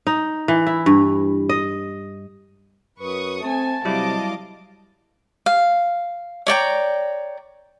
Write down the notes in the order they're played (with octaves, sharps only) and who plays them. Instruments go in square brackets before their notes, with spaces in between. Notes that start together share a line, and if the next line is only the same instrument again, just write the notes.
[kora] D#4
E3
E4
G2
D#5
[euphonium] F#2 [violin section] B4 C#6 D#6
[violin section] A3 G#5 [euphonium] C4 [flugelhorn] A5
[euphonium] C3 [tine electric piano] F#3 G3 E4 [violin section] D#5 F5 D6
[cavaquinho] F5
C#5 D5 G5 A#5